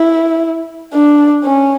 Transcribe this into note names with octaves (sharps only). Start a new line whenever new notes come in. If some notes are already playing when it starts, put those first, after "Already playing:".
Already playing: E4
D4
C#4